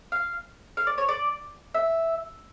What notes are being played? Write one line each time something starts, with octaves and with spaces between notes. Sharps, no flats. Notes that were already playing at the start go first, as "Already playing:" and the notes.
F5
F5
D5
C#5
D5
E5